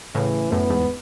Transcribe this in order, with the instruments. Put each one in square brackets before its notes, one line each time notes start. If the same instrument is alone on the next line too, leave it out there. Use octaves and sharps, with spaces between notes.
[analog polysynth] A2 C#3 [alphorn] E3
[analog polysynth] F#2 A2 [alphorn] B3
[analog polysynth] E2 G#2